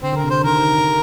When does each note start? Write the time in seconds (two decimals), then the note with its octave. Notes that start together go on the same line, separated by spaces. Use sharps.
0.02 D3 C4
0.13 D3
0.16 A#4
0.24 C3
0.30 D3 C5
0.44 D#3 A#4
0.55 D3